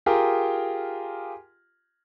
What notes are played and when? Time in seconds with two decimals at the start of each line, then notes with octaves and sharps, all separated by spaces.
0.06 F4 G4 G#4 A#4